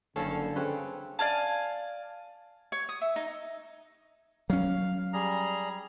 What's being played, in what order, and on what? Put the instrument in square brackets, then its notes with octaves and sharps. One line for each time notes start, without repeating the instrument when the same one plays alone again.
[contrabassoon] F#1 [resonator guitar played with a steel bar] G2 A4 [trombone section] D3 [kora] C#4 C#5 F5
[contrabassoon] C#3 [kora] C4 C#4 B4
[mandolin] D5 F5 G#5 A5
[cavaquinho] C#5
D#6
E5
D#4
[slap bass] F#3 C#4 [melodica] F5
[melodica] G3 G#4 A#5